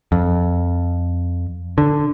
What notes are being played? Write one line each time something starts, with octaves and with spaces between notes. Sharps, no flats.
F2
D3